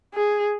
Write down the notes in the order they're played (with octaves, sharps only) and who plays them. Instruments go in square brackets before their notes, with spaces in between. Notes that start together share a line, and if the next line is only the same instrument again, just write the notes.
[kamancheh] G#4